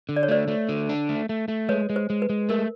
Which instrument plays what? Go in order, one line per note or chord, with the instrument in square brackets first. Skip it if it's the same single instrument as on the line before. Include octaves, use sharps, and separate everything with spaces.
[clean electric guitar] D3
[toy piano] D5
C#5
[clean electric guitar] A3 [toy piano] C5 D5
[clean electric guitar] A3
D3
D4
A3
A3
A3
[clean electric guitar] G#3 [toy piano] B4 C#5
[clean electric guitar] G#3
[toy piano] C5
[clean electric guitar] G#3
[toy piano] B4
[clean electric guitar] G#3
[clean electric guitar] A3 [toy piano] A#4